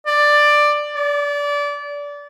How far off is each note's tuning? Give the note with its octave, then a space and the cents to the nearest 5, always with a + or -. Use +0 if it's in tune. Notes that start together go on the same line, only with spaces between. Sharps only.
D5 +10
D5 -25